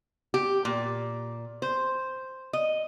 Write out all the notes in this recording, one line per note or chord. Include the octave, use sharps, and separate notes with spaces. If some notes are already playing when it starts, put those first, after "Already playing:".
G4
A#2
C5
D#5